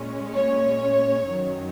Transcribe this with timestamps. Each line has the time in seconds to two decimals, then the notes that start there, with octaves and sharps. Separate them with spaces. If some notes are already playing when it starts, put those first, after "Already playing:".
Already playing: A#2 G#3 C#4
0.36 C#5
1.26 F#2 D#3 F#3 C#4